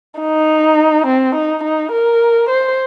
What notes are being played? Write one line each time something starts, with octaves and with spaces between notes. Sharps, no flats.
D#4
C4
D#4
D#4
A#4
C5